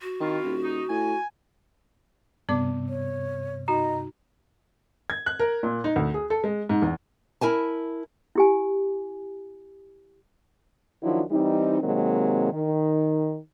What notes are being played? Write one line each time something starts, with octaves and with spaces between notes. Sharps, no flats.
F#4
D#3 C4 E4 F4
D#1
D#4
A2 G#5
G2 C3 B3 D5 D6
C#5
D#4 F#4 D#5 A#5
G#6
F#6
A#4
A#2
D#4
D2
G#4
A4
G#3
G#2
E2
E4 A#4 G#5 A5
E4 G4 G#5
D#3 F3 F#3 D4 E4 F#4
E3 G3 C4 D#4
C3 D#3 F#3 G#3 A#3 C4
D#3